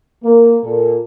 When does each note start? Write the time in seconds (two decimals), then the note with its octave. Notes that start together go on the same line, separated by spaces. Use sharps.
0.23 A#3
0.63 A#2 A4